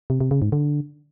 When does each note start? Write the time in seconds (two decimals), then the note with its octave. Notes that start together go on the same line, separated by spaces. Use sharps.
0.10 C3
0.21 C3
0.31 C#3
0.42 G#2
0.52 D3